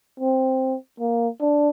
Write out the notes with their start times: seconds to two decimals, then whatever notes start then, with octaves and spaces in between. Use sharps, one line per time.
0.20 C4
1.00 A#3
1.41 D4